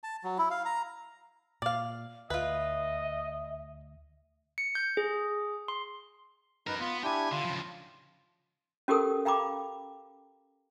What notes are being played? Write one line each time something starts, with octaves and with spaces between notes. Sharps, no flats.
A5
F#3
E4
F5
A#5
A#2 D5 F5
D2 F4 B4 D#5 E5
C#7
G6
G#4
C6
F#2 D#4 A#4 B4
B3 F4
D4 E4 G4 G5 G#5
D3 F4
C#3 F3
C#4 F#4 G4 A4 A#4 D#6
F5 G5 A#5 B5 D6